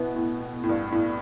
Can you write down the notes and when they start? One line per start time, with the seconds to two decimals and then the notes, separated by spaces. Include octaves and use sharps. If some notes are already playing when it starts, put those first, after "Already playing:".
Already playing: B2 B3 E4
0.16 A2
0.64 A2
0.69 G2
0.92 A2